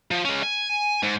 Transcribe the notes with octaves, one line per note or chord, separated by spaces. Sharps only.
F3
G#3 C#4
G#5
G#2